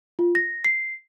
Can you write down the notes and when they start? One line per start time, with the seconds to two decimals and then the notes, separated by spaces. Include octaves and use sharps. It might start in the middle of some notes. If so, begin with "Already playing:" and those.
0.19 F4
0.35 A#6
0.65 C7